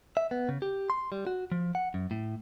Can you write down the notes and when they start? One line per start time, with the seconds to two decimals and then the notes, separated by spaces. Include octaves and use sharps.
0.17 E5
0.31 B3
0.49 C#3
0.62 G4
0.90 C6
1.12 G3
1.27 F#4
1.52 F3
1.75 F#5
1.94 F#2
2.11 A2